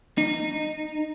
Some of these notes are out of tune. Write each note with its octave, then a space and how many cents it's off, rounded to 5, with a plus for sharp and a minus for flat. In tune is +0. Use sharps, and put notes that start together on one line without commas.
D#4 -15